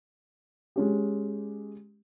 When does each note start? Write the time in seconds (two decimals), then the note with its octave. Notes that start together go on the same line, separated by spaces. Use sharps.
0.76 G#3 C#4 G4